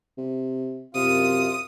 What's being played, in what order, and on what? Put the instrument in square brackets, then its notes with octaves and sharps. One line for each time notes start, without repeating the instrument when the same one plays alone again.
[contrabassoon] C3
[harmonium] F#2 F4 F5 [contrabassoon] C3 [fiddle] D#6